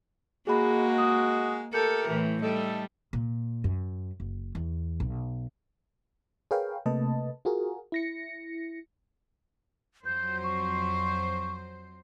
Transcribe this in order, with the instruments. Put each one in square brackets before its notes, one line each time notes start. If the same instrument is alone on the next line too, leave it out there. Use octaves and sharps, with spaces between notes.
[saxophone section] G#3 F#4 [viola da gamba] A#3 [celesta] G#4 B5
[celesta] D#6
[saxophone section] A3 G4 A#4 [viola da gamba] A4 [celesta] G6 C#7
[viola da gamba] A2 E3
[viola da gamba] G3 [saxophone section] A3 D#4 A4
[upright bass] A#2
F#2
F#1
E2
B1
[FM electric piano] G#4 A#4 B4 C#5 F5 G5
C3 A3 A#3 B4 D#5 A5
F4 F#4 G#4 A#4
E4 A#6 C#7
[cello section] F2 F#3 C5 [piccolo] G6
[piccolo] C#6